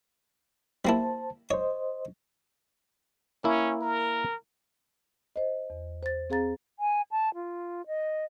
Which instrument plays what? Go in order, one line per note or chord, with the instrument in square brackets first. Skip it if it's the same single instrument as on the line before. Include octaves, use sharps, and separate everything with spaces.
[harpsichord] G3 A#3 E4 [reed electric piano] C5 A5
[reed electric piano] C5 D#5 [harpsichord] C#5
[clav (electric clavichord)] A#3 E4 [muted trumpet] C#4
[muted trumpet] A#4
[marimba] C5 D#5
E2
C5 A6
C4 G#4 F5 A#5 A6
[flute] G#5
A5
F4
D#5